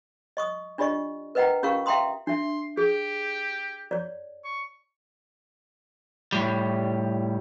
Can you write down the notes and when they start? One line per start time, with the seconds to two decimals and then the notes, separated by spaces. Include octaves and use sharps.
0.37 D#5 C#6 D#6
0.78 D4 F4 G4 D5 D#5 C#6
1.35 A#4 B4 D#5 F#5 G5 A#5
1.63 C#4 F4 G4 A#4 F5 C#6
1.86 E5 F5 G5 A#5 C6 D#6
2.27 D4 E5 C6
2.77 G4 G#4
3.91 C#5 D5
4.45 C#6
6.32 A2 G3